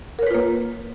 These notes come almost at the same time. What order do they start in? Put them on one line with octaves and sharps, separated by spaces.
A#4 C#5 B4 F4 A#3